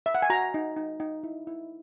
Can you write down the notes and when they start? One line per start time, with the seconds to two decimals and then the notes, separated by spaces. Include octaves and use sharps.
0.06 E5
0.15 F#5
0.22 G#5
0.30 F#4 A#5
0.54 D#4
0.76 D#4
1.00 D#4
1.23 E4
1.47 E4